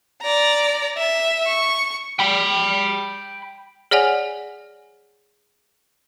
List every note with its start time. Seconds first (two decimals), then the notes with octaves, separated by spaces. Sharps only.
0.22 D5 A#5
0.98 E5
1.46 C#6
2.19 G5 B5
3.91 G#4 C#5 D5 F#5 G#5